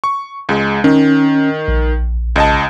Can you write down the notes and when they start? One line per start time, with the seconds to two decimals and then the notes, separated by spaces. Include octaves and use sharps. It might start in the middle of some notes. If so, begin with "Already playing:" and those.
0.04 C#6
0.49 C#2 G#3
0.84 D#3 C#4
1.68 A#1
2.36 C#2 D#5 A5